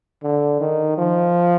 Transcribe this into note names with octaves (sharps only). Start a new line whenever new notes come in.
D3
D#3
F3